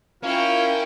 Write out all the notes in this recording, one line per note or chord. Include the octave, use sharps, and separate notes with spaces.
C#4 E4 F4 A#4 C#5 F5 G5